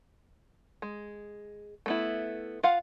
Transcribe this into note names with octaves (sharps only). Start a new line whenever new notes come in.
G#3
A3 B3 E4
F4 F5 F#5